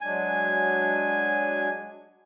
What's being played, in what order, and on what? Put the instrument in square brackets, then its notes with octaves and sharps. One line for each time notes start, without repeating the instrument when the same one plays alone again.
[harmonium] F#3 G#3 D4 [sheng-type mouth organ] G#5